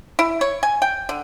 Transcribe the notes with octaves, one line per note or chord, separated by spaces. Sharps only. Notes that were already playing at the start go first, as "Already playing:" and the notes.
E4
C#5
G#5
G5
D3